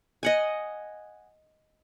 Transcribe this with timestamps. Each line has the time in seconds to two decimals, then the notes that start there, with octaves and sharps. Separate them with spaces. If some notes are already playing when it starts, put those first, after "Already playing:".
0.23 D#5 F#5 G#5